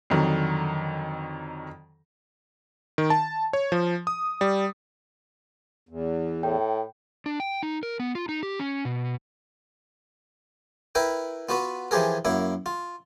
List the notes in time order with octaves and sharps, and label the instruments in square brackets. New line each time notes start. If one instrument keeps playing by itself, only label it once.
[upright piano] F2 D3 D#3 F#3
[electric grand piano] D#3
A5
C#5
F3
D#6
G3
[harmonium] E2
[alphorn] A2 [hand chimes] G5
[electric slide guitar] D4
G5
D#4
A#4
B3
F4
D#4
G4
C#4
B2
[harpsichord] E4 A#4 B4 G5
B3 F4 F#4 B4
E3 F3 G4 G#4 A#4
F#2 A#3 E4
F4